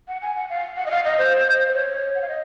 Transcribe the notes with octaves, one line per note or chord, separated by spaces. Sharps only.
F#5
G#5
F#5
F5
F#5
D#5
F5
D#5
C5
C5
C#5
F#5
F5
D#5